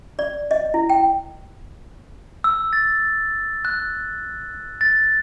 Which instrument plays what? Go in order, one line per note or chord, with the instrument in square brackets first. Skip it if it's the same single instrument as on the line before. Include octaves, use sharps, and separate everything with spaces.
[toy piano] D5
D#5
E4
G5
[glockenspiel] E6
A6
F#6
A6